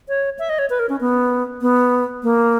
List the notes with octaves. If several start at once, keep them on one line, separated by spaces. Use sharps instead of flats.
C#5
E5
D#5
C#5
B4
A#4
C#4
B3
B3
A#3